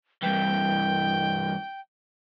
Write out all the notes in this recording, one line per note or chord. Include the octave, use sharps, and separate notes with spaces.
G2 E3 G5